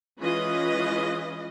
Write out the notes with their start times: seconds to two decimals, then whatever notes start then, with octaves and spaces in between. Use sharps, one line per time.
0.19 E3 G#3 C#4 F4 B4 D#5